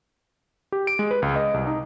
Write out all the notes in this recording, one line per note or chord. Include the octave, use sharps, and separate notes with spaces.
G4
D7
G#3
B4
C#2
D#5
C2
D#4